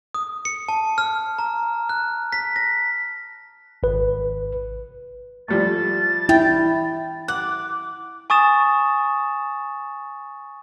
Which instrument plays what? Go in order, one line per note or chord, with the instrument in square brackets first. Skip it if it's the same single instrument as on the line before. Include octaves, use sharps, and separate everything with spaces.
[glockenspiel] D#6
C#7
A5
F6
A#5
F#6
B6
A#6
[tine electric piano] G#1 B4
[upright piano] F3 G3 A3 [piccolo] A6
[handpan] E4 [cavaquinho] G5
[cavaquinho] F#5 [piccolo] D6 [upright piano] F#6
[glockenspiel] G#5 C#6 D#6 A6 E7